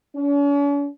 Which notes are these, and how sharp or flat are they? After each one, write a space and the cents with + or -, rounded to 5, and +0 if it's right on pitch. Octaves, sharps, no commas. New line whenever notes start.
C#4 +45